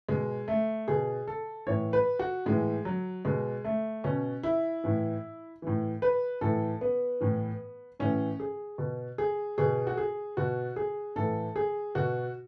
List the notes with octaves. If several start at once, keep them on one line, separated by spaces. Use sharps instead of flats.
B2 G#3
A3
B2 G#4
A4
A2 E3 C#5
B4
F#4
A2 E3 G#3
F#3
B2 G#3
A3
B2 C#4
E4
A2 E3
A2 E3
B4
A2 E3 A4
B3
A2 E3
A2 E3 C#4
G#4
B2
G#4
B2 G#4
F#4
G#4
B2 F#4
G#4
A2 E3 A4
G#4
B2 F#4